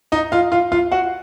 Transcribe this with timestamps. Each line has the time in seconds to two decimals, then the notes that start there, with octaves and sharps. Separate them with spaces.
0.12 D#4 D#5
0.32 F4 F5
0.52 F4 F5
0.72 F4 F5
0.92 F#4 F#5